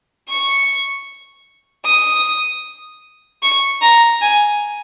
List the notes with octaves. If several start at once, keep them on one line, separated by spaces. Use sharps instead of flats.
C#6
D#6
C#6
A#5
G#5